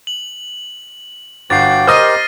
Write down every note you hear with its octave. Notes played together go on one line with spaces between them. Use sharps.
F#7
G1 F#4 G5 D6 A6 C7
G4 A#4 C5 D#5 D#6 F6 A#6 D#7